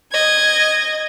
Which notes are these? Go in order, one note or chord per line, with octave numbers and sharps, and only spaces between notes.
D#5 G#6